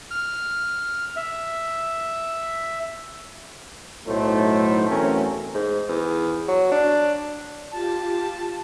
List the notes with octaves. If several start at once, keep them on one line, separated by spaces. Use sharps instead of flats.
F6
E5
B1 A2 F#3 A3 D#4 C5
E2 A3 C4 C#4 F#4 A#4
G#2
E2
F#3
D4
F4 G4 A5